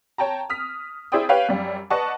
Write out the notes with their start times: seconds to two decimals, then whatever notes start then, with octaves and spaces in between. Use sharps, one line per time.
0.18 C#5 G5 A5 A#5
0.50 D#6 F6 B6
1.12 E4 G#4 C5 D5 G5 D#6
1.29 G4 B4 C#5 F5 G5
1.49 F#2 G3
1.90 B4 D5 D#5 F#5 A5 C#6